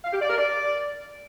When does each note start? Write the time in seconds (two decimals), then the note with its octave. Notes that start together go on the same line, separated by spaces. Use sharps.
0.05 F5
0.13 G4
0.21 D5
0.29 A#4
0.38 D5